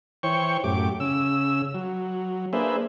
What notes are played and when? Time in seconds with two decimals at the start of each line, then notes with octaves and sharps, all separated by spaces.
0.23 E3 C5 C#5 G5 C#6
0.64 F#2 A2 G4 D6
1.00 C#3 E6
1.74 F#3
2.53 A#3 D4 G#4 B4 C5 E5